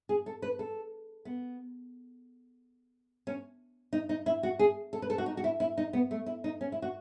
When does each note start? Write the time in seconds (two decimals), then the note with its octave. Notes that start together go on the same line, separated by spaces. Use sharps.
0.09 G#4
0.26 A4
0.42 B4
0.59 A4
1.25 B3
3.27 C#4
3.93 D#4
4.09 D#4
4.26 E4
4.43 F#4
4.59 G#4
4.93 A4
5.02 B4
5.10 A4
5.18 F#4
5.26 D#4
5.37 F#4
5.44 E4
5.60 E4
5.78 D#4
5.93 B3
6.11 A3
6.26 E4
6.44 D#4
6.61 C#4
6.72 E4
6.82 F#4